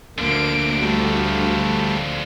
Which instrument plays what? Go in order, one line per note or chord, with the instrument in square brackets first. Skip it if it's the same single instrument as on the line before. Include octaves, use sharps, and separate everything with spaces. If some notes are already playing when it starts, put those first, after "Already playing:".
[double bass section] D2 [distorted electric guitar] D3 F3 [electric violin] A#3 D7
[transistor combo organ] G3 A3 [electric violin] F#4